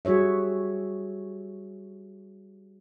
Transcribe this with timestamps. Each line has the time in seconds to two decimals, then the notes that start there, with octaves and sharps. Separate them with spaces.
0.05 G3 F#4 G#4 C#5 E5